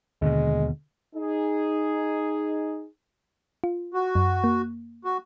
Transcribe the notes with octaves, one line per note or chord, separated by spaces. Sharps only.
D#2 B2 D3 G#3
D#4 G#4
F4
F#4
F#2
A#3
F#4